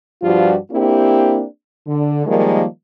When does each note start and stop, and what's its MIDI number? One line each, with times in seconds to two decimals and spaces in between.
0.23 0.56 43
0.23 0.56 53
0.23 0.56 55
0.23 0.56 65
0.23 0.56 66
0.72 1.44 58
0.72 1.44 60
0.72 1.44 62
0.72 1.44 64
0.72 1.44 67
1.87 2.26 50
2.26 2.64 51
2.26 2.64 53
2.26 2.64 55
2.26 2.64 56
2.26 2.64 58